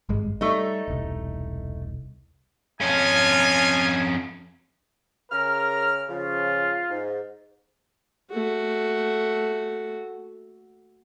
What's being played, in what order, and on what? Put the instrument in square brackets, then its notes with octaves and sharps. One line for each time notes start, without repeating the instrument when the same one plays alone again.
[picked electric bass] G#1 G2 G#3
[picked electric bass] G3 [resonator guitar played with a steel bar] A3 D#4
[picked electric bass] E1 C2
[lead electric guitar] F2 C#4 [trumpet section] D#4 F4 G#5
[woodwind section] C#3 F6 [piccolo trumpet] A#4
[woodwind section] C#3 F3 [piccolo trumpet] F4
[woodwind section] G#2
[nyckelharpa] A3 F#4